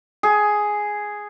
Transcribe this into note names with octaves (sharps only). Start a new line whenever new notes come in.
G#4